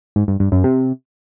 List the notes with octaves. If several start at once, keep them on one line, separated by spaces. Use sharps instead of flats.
G#2
G2
G2
F#2
C3